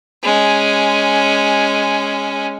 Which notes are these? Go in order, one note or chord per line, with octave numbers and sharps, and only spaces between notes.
G#3 C#4